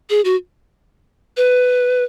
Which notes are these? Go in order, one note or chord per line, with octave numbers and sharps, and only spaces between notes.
G#4
F#4
B4